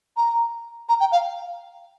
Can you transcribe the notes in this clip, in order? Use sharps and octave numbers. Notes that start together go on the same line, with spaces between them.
A#5
A#5
G5
F5